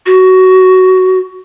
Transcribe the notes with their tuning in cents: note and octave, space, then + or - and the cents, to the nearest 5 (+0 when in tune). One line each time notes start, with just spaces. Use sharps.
F#4 +15